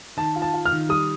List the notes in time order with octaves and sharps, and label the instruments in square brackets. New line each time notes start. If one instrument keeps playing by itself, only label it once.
[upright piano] D#3 [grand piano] A5
[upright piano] F4
[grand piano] A5
[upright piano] F4
[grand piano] F6
[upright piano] D#3
[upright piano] G3 [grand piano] D#6